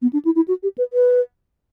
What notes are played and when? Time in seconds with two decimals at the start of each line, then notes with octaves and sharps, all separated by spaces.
0.02 B3
0.13 D4
0.25 E4
0.35 E4
0.48 F#4
0.63 G4
0.78 B4
0.93 B4